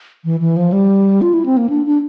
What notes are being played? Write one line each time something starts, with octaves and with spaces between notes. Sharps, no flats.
E3
E3
F3
G3
F4
E4
C4
A#3
D4
D4